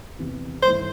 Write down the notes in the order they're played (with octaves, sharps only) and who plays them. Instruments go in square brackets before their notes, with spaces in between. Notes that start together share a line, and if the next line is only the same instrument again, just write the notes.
[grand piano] E2 C3 E3
[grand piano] G2 D#3 A3 E4 [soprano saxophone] C5